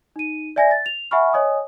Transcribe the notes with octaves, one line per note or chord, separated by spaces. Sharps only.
D#4 D#7
D5 E5 G#5 G#6 A#6
A6
F7
E5 F#5 G#5 B5 C#6 F6
C#5 D#5 G#5 D#6